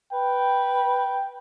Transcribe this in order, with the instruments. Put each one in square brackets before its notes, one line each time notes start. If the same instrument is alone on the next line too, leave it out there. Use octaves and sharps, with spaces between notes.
[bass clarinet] B4 [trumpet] G5